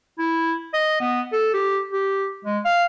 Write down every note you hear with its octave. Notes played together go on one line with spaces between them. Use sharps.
E4
D#5
B3
A4
G4
G4
G#3
F5